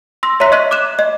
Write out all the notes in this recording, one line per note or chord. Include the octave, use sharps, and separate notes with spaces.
C6 E6 A#6
C#5 E5 A#5 C6 F#6 B6
D#5 C#6 F#6 D#7 F#7
D6 F#6 E7
D#5